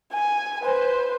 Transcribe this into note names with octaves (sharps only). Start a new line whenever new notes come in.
G#5
B4 C5